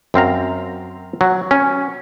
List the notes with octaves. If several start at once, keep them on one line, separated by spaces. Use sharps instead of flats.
F#2 C4 F5 A#5
F#3
C#4